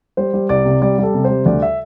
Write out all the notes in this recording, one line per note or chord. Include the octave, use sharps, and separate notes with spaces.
G3 C5
G3
C2 D5
C3
G3 D5
G3 A4
C3
C5
G3
D2 D5
E5